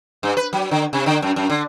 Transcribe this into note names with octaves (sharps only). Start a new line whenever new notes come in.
G2
B4
F#3
D3
C3
D3
F#2
F#2
D3